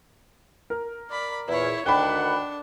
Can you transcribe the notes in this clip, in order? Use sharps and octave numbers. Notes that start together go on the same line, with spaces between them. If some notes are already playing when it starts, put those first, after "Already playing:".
A#4
D5 B5
E2 A#2 E4 C#5
D2 D#3 D4 F#5 G5 B5